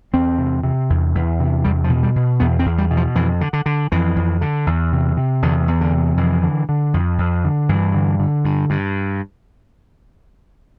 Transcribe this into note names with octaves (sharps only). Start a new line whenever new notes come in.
E2 C4
C3
C3
E2
E2
C3
E2 G3
F3
B2
G3
B2
E2 B3
C4
E2
G3
B2
F3
F2 E3
D3
D3
D3
F2 E3
F2
D3
E2
C3
C3
E2 D3
E2
D3
C3
F2 E3
D3
D3
F2
F2
D3
G2 E3
D3
D3
G2
G2